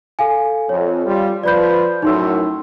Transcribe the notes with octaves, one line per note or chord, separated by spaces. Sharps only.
A4 F5 G#5
F2 C#5
G3 F4
F3 B4 D5 B5 G6
F#2 A2 D#4 C6 E6